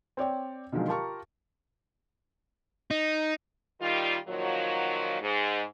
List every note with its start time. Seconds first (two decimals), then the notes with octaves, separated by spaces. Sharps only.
0.17 C4 C#5 D5 G5
0.72 B2 D3 D#3 F3 F#3 G#3
0.88 F4 G4 A#4 A5 A#5 C#6
2.91 D#4
3.81 D#3 G3 F4
4.28 A#2 D#3 F3 F#3
5.21 G#2